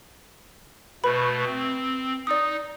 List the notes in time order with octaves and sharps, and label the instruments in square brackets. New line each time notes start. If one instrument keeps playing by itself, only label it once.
[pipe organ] B2 A3 [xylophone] B4 B5
[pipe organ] C4
[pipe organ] D#4 [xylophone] D5 D#6